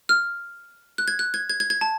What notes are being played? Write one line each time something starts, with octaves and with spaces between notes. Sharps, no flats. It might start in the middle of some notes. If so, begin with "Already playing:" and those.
F6
F#6
G#6
F#6
G#6
G#6
G#6
G#6
A5